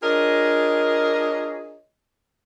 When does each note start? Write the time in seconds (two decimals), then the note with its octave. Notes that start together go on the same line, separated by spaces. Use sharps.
0.03 D4 F4 G#4 A#4 C#5 D#5